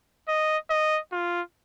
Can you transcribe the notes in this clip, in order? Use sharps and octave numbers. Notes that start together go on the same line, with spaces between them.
D#5
D#5
F4